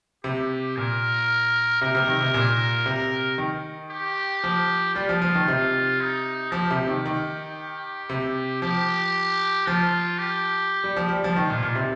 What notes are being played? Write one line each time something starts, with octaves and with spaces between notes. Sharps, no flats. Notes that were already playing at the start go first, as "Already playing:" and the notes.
C3 G4
A#2 A#4
C3 A#4
C3
D#3
C3
A#2
C3
D#3
G4
F3
G3 F4
F3
F3
D#3
C3
D#4
F3 G4
C3
D#3
D#3
C3
F3 G4
F3 F4
G4
G3
F3
G3
F3 F4
D#3
A#2
A#2
C3